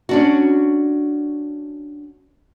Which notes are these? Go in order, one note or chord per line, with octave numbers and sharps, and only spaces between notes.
C#4 D4 F#4